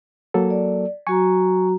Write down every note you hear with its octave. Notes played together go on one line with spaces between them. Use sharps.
F#3 A#3 A4
D5
F#3 F#4 G#5 A#5 C#6